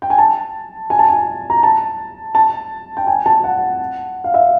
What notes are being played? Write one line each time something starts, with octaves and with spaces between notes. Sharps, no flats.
G5
G#5
A5
G#5
A5
G#5
A#5
A5
A5
G5
G#5
A5
F#5
F5
E5